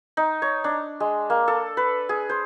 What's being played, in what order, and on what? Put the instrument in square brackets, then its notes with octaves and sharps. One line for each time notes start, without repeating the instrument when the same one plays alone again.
[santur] D#4
C#5
D4
G#3
A#3
A4
B4
G#4
C5